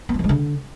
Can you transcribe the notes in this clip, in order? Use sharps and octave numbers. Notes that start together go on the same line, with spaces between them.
B3
F#3
F3
G#3
D3